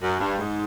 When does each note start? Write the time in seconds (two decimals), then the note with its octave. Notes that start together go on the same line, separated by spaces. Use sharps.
0.02 F#2
0.21 G2
0.39 G#2